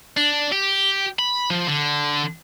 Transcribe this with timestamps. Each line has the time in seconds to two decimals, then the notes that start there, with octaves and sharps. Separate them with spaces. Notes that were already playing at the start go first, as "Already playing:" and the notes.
0.17 D4
0.52 G4
1.19 B5
1.50 F3
1.67 D3